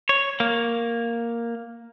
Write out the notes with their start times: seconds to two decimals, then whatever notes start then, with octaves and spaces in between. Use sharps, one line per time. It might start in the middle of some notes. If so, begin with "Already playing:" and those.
0.09 C#5
0.40 A#3